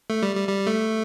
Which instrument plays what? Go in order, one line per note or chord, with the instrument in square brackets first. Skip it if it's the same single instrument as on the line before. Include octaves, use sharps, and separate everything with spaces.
[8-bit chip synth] A3
G3
G3
G3
A3